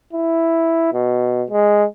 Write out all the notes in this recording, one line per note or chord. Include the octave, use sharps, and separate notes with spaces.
E4
B2
G#3